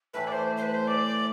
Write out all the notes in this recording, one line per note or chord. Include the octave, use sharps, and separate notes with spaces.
A2 E3 A3 E4 B4
D5
C5
C5
B4
C5
D5